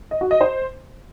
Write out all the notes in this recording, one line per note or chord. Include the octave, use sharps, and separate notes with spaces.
D#5
F#4
D#5
C5